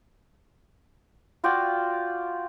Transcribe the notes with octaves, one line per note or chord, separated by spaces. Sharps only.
F4 F#4 D5 G5